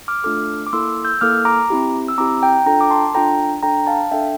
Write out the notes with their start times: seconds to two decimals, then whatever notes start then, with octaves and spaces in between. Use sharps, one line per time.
0.08 D6 F6
0.24 A3 D4 F4 A4 D6 F6
0.67 D6
0.73 A#3 E4 A4 C6 E6
1.05 E6 G6
1.21 A#3 E4 A4 D6 F6
1.45 A#5 D6
1.70 C4 E4 G4
2.08 E6
2.18 C4 E4 G4 A#5 D6
2.42 G5 A#5
2.66 D4 F4 A4 G5 A#5
2.81 D6
2.90 A5 C6
3.15 D4 F4 A4 G5 A#5
3.63 D4 A4 G5 A#5
3.87 F5 A5
4.11 D4 A4 E5 G5